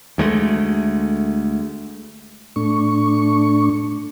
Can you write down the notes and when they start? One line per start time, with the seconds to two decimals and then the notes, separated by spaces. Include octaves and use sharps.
0.18 D2 G#3 A3
2.56 A2 A3 D4 C#6